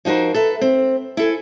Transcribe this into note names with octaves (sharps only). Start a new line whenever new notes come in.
F3 D#4 F#4 A#4 C5
A4 B4 E5
C4
E4 A4 G#5